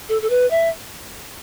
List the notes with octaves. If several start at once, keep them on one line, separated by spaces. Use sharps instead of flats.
A4
A4
B4
E5